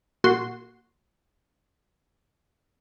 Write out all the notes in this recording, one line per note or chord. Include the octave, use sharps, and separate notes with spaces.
A#2 F#4 C6